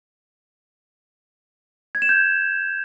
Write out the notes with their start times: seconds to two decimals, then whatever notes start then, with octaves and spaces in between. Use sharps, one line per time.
1.95 G#6
2.02 E7
2.09 G6